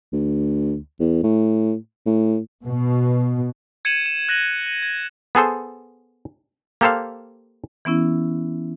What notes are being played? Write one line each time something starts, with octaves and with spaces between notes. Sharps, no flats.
D2
E2
A2
A2
B2
G#6 C#7 D#7 E7 F#7
E7
F#6 A#6 D#7 F#7
D#7
G#6
B3 G#4 A4 C5
A#3 G4 A4 C5 F5
E3 B3 C#4 E4